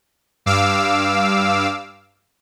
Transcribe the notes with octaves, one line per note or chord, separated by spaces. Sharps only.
G2 F5 D6 E6